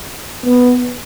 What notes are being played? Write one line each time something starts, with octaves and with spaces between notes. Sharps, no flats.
B3